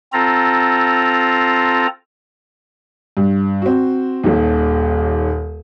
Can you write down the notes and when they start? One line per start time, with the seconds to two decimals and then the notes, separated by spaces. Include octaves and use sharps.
0.13 C4 F4 A4 A#5
3.17 G2
3.62 C4 F#4
4.24 D#1 D#2